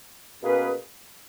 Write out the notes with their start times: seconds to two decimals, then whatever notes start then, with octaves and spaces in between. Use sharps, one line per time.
0.42 B2 A#3 C#4 G#4 B4